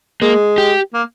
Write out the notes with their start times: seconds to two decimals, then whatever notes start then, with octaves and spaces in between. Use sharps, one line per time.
0.22 G#3 A#3
0.58 G4
0.94 A#3